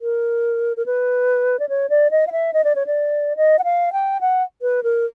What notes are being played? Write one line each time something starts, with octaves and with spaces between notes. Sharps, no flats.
A#4
A#4
B4
D5
C#5
D5
D#5
F5
E5
D#5
D5
C#5
D5
D#5
F#5
F5
G5
F#5
B4
A#4